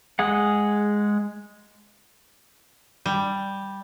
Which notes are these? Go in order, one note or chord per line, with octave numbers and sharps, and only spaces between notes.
G#3 G#4 F#5
G3